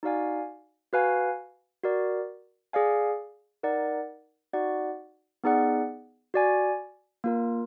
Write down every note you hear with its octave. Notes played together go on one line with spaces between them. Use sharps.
D#4 F#4 D5 F5 G#5
F#4 B4 F5 G#5
F#4 A#4 D5
G#4 D5 F5 G#5
D#4 A#4 D5 F#5
D#4 F#4 D5 F#5
B3 D#4 G#4 D5 F#5
F#4 D5 G#5
A#3 F4 A#4